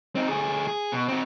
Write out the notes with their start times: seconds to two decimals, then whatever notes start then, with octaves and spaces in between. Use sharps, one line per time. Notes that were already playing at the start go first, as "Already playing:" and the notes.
0.15 C4 D#4
0.28 D2 G#4
0.68 G#4
0.92 B2
1.08 C4 F#4